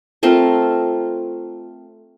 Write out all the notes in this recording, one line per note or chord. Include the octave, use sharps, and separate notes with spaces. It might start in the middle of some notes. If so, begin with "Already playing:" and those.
A3 C4 F4 A#4